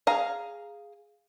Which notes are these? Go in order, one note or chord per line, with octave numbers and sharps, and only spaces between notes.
G#4 F5 A#5